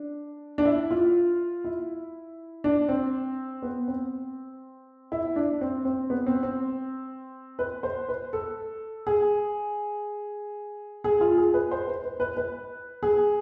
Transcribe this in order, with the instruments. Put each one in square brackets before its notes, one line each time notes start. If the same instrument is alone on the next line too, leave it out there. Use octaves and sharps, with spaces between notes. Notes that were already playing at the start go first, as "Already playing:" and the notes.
Already playing: [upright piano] D4
D4
E4
F4
E4
D4
C4
B3
C4
E4
D4
C4
C4
B3
C4
C4
B4
C5
B4
A4
G#4
G#4
F4
G#4
B4
C5
B4
B4
B4
B4
G#4